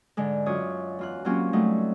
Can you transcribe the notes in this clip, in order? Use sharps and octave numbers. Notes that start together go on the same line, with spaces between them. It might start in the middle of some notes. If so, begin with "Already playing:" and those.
G#2 D3 G#3
F#2 D4 F4 C#5 D#6
E2 F4 F#6
F#3 A#3 C4 C#4 F4 G4
F#3 G3 A3 D#4